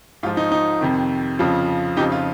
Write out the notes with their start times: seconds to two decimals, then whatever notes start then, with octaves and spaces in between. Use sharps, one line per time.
0.23 G#2 F4
0.26 F3
0.37 D#4
0.52 D#4
0.81 F2 C3 D#3
1.39 F2 C#3 F3 F4
1.97 F2 C#3 F3 D#4 G4
2.12 F4